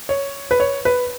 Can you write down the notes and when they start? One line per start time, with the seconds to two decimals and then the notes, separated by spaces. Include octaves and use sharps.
0.09 C#5
0.51 B4
0.60 C#5
0.85 B4